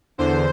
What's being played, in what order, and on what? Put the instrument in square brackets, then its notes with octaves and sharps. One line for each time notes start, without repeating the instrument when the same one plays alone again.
[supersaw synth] E2 D3 C5